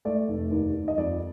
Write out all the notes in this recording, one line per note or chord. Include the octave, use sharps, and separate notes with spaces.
A3 D5
F1
D#2
D#2
D#5
F2 D5